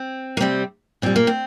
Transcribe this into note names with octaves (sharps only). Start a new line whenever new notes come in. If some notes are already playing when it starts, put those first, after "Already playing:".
Already playing: C4
A#3
C3 G3 C4
A#2 G3 C4
A#3
C4